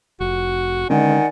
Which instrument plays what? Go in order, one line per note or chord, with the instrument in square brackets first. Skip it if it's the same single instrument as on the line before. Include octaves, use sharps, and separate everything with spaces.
[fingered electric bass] F1 [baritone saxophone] F#4
[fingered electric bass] D3 G#3 C#4 [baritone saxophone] D#3 [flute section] D5 F#5 G#5